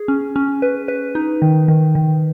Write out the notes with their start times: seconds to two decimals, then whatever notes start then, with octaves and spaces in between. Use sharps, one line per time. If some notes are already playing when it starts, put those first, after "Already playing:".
Already playing: G#4
0.08 C#4
0.36 C#4
0.62 B4
0.88 B4
1.15 D#4
1.42 D#3
1.68 D#3
1.95 D#3